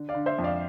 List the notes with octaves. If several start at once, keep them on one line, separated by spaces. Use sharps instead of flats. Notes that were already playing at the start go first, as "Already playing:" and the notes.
Already playing: D3
D5 F5
D3
C5 E5
F2
D5 F5